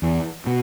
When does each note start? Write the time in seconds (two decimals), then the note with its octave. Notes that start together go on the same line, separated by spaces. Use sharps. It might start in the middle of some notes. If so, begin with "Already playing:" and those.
0.02 E2
0.47 B2